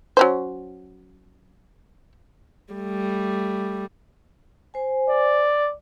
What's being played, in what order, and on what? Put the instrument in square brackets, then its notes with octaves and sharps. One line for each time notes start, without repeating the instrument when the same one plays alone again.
[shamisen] F#3 C#4 C5
[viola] G3 A3
[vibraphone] C5 G#5
[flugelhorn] D5